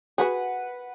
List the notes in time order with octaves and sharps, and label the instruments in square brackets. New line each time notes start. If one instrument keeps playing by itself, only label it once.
[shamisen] F#4 G#4 [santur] B4 F#5